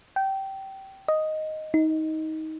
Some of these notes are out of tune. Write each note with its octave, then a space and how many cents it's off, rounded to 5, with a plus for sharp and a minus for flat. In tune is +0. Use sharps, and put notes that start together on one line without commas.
G5 -20
D#5 +0
D#4 +20